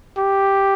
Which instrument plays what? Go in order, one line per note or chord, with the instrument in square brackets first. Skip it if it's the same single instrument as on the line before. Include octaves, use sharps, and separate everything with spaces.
[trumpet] G4